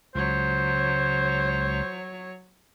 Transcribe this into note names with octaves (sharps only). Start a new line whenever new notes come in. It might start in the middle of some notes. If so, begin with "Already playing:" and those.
C#2 F#3 C5 C#5